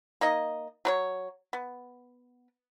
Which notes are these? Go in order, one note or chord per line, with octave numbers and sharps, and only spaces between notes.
A#3 D#4 D#5
F#3 B4 C#5
B3